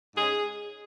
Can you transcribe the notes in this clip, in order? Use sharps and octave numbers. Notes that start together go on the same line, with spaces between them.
G#2 G#3 C#4 G#4